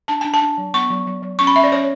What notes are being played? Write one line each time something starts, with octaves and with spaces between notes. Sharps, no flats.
D4 A5
D4 G#5
A5
D4
F#3
B3 C#6
F#3
F#3
F#3
C#4 C#6
B5
C#4 E5
D5
C#4 C#5